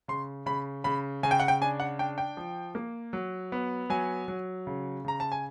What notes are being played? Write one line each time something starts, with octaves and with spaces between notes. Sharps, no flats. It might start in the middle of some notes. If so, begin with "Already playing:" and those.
C#3 C6
C#3 B5
C#3 B5
C#3 G#5
G5
F#5
G5
D4 G#5
F#5
D4 G5
G5
F3
A#3
F#3
B3
F#3 G#5
F#3
C#3
C#3 A#5
A5
G#5